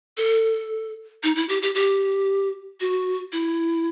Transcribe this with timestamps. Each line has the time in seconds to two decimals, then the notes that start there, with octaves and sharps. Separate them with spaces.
0.17 A4
1.23 D#4
1.36 E4
1.49 G4
1.62 G4
1.75 G4
2.80 F#4
3.32 E4